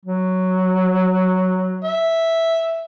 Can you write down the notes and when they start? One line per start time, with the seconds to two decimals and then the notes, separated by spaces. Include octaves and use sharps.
0.05 F#3
1.84 E5